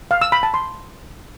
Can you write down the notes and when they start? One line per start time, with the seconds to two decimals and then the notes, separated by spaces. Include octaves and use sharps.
0.11 F5
0.21 E6
0.32 B5
0.43 A5
0.54 C6